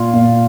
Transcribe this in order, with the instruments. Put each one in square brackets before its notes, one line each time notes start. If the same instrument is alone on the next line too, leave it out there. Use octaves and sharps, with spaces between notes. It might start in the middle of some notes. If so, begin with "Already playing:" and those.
Already playing: [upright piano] A#2 F4
A#2